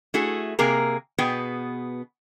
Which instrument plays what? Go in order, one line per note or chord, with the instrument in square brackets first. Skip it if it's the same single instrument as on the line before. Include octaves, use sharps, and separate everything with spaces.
[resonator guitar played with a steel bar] A3 E4 F#4 G#4
C3 A#3 G#4 A#4
B2 B3 G#4 G5